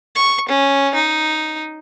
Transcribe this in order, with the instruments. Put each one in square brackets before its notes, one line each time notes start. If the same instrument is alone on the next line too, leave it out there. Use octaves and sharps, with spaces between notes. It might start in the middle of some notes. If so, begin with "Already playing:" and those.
[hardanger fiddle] C#6
C#4
D#4